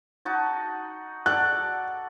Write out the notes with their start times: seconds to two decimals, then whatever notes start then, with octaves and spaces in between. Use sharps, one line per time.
0.25 D#4 F#4 A5
1.26 F#4 A4 D5 F#6